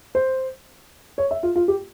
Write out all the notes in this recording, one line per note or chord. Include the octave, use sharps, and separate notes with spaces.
C5
C#5
E5
F4
F4
G4